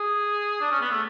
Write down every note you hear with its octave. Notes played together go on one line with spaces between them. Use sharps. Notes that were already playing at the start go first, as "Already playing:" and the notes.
Already playing: G#4
D4
C#4
B3
A3